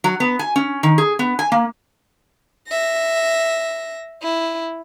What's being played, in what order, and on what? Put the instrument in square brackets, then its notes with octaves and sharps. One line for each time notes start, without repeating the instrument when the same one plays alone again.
[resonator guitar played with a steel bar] F#3
B3
G#5
C#4
D#3
G#4
B3
G#5
A#3
[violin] E5 A#6
E4